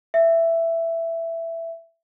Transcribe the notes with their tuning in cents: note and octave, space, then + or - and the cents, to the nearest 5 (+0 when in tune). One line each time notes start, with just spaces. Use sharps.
E5 +10